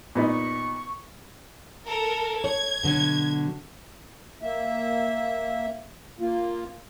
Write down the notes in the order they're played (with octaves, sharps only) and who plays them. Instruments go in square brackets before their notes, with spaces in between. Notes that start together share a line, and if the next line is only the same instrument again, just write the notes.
[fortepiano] A#2 B3 D#4 [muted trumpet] C#6
[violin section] A4 A#4
[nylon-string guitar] C#5 [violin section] G#6
[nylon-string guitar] B2 D3 F#3
[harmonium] A#3 E5
A#3 F4